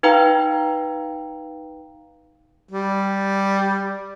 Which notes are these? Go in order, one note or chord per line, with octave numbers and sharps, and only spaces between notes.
D#4 B4 F5 G5 A#5
G3